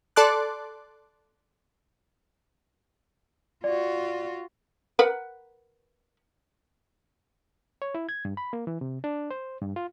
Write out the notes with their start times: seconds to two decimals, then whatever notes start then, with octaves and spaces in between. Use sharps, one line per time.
0.16 A4 D5 A5 C6 D6 F#6
3.64 F4 F#4 D5
4.99 A#4 B4 F#5
7.82 C#5
7.95 E4
8.09 G#6
8.25 G2
8.37 B5
8.53 A#3
8.67 E3
8.81 C3
9.04 D4
9.31 C5
9.62 G2
9.76 F4